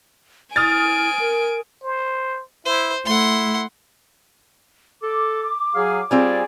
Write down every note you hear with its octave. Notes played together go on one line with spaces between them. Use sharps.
E4 G#5 D#6 F6 A6 D7
A#4
C5
E4 C5
A3 E4 F#5 C6
A4 D6
F#3 G#4 F5
G3 C4 F4 G#4 D5 G#5